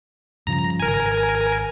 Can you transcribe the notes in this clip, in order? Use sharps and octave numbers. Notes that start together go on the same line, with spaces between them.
G2 C#3 F3 A#5
G#1 A#4 G#5